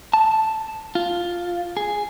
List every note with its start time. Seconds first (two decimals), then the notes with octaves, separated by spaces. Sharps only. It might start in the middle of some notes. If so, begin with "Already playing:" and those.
0.14 A5
0.95 F4
1.77 G#4